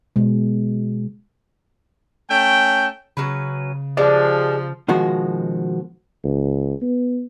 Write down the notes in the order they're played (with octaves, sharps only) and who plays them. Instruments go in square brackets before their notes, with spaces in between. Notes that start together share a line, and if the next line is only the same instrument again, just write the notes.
[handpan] B2 G#3
[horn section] A3 C#4 G5
[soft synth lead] C#3 [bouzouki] F#3 C#4 B4
[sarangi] F3 [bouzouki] G3 G#3 D4 [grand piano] D5
[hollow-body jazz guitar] B2 D#3 F3 G#3 F#4
[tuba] C#2
B3